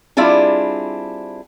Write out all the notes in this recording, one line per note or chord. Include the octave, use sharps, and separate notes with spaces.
G3 C4 D4 E4 F4 G#4